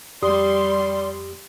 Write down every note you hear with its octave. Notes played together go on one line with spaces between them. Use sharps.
F2 G3 G4 D5 C6 D#6